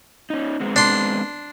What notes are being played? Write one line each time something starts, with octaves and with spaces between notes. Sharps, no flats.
C#4 D#4
G#3 B3 C4
D4 C6